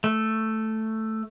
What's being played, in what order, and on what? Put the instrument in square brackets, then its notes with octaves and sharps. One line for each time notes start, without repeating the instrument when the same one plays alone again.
[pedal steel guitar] A3